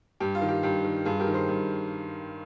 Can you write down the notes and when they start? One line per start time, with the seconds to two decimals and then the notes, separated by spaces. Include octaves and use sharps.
0.20 G2 G4
0.35 F4
0.42 D#3
0.48 G4
0.63 G2 G4
0.84 D#3
1.05 G2 F4 G#4
1.20 G4 A#4
1.27 D#3
1.34 G#4 C5
1.49 G2